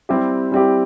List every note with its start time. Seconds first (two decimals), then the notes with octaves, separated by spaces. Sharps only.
0.09 G3 C4 E4 G4
0.52 G3 C4 E4 G4